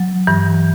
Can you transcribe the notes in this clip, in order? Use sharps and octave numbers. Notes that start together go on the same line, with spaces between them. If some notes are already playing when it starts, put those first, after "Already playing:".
Already playing: F#3
G2 E3